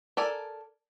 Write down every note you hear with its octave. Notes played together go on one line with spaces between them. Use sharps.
A4 A#4 D5 G#5